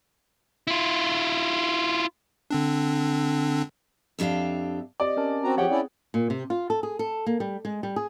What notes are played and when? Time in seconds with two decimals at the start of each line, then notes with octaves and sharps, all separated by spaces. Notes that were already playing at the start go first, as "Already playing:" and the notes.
0.67 E4 F4
2.51 D3 C4 D4
4.19 F2 D4 G4 E5 F5
5.00 C4 G4 D5 D#5
5.17 C#4 A#4 A5
5.44 C4 F#4 A#5
5.57 F3 C4 G4 G#4 C#5 F#5 G5
5.70 C#4 E4 D5
6.14 A#2
6.30 C3
6.50 F4
6.70 A4
6.83 G#4
6.99 A4
7.26 A#3
7.40 G3
7.65 G#3
7.83 G3
7.96 G#4